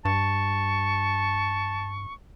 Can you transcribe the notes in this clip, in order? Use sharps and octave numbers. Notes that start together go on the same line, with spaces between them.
G2 A5 C#6